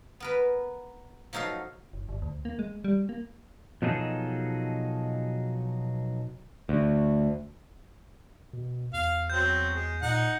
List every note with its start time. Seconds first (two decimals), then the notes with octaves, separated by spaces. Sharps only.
0.20 B3 A#4 B4
1.33 F3 F#3 D#4 A4 F5
1.93 F#1
2.09 G1
2.22 D2
2.45 A#3
2.59 G#3
2.84 G3
3.09 A#3
3.82 B2 F3 F#3 D#4 G#4 A4
6.69 D2
8.53 B2
8.93 E2 F5
9.30 F#3 C4 G6
9.74 G#3
10.02 A#2 D#4 F#5